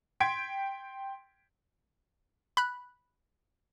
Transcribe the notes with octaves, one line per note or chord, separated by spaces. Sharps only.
G5 C6 G#6 B6 D7
B5 F#6